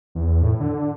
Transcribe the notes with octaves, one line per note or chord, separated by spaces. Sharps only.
E2
A2
D3
D3